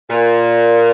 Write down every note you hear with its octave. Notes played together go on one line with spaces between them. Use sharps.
A#2